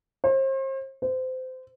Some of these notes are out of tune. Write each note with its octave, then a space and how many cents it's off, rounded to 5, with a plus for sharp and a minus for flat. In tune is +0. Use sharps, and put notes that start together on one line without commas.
C5 +40
C5 -25